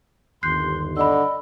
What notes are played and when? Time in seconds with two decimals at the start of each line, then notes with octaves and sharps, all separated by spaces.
0.43 G1 D#2 C6 F#6 G6 C7
0.96 D3 D#5 B5 E6